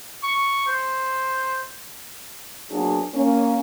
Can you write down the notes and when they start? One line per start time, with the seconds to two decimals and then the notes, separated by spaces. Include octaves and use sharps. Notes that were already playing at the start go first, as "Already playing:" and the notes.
0.23 C#6
0.67 C5
2.71 F#3 A#3 B3 D4 F#4 G#4
3.14 A#3 C#4